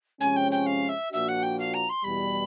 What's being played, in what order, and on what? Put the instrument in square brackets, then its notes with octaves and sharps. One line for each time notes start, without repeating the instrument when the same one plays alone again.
[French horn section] C3 F3 G#3 C#4 [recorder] G#5
[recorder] G5
G5
F5
E5
[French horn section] A#2 F3 A#3 D4 F#4 [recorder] E5
[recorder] F#5
G5
F5
A#5
C6
[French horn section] E2 B2 G3 [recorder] B5